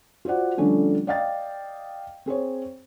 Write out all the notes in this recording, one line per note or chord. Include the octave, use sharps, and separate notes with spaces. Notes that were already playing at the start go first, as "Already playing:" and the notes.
F4 F#4 C5 D5 F#5
D3 F3 G3 A3 C#4 D4
D5 D#5 F5 G5 A6
C4 G#4 C5 C#5